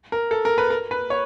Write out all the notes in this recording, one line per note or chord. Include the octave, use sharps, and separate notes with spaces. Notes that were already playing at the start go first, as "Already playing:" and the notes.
A#4
A4
A#4
B4
A#4
B4
C#5